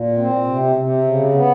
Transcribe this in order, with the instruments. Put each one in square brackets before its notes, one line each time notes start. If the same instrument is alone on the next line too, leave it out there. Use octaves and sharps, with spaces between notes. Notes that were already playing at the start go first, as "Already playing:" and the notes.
Already playing: [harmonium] A#2
C4
C3
C3
C#3
B3